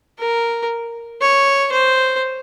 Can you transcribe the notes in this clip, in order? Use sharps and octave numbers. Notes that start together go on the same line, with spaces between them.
A#4
C#5
C5